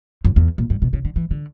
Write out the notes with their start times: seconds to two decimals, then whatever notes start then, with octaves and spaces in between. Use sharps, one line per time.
0.25 F#2
0.36 E2
0.58 A#2
0.70 G2
0.82 B2
0.93 C#3
1.05 D3
1.16 E3
1.31 D3